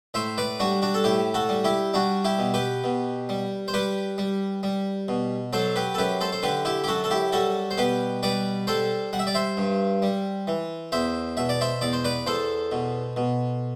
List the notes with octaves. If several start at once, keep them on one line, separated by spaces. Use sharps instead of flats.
A2 C5 E5
B4 D5
G3 D4 F#4
D4 F#4
A4
A2 E4 G4
F#4 A4
G3
E4 G4
G3 D4 F#4
E4 G4
B2
G4 B4
B2
G3
C5
G3 G4 B4
G3
G3
B2
F#3 A4 C5
G4 B4
A4
F#2 G4 B4
A4 C5
C5
D3 G4 B4
E4 G4
G4
F#2 F#4 A4
A4
E4 G4
G3 F#4 A4
C5
B2 G4 B4
G3 B4 D5
G3 A4 C5
G3 F#5
E5
D5
C5 E5
G2
G3
E3
E2 C5 E5
B2 E5
D5
C5 E5
E2 D5
C5
B4 D5
E2 A4 C5
B2
B2